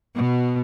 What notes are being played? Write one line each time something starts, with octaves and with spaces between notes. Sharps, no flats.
B2